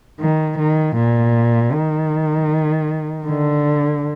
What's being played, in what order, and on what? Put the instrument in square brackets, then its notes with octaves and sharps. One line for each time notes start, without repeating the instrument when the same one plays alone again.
[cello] D#3
D#3
A#2
D#3
D3